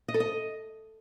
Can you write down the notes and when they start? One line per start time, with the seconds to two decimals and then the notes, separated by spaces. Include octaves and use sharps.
0.08 D#5
0.14 A4
0.20 D#5